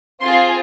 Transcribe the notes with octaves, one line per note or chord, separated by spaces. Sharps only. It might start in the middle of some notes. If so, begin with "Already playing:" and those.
C4 F4 G#4 C6